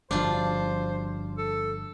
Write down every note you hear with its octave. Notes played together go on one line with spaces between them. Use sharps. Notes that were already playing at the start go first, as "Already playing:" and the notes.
G1 F3 D4 F4 C5
A4